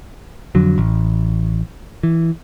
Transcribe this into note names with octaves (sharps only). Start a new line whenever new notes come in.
F2 D3 F#3
A1
E3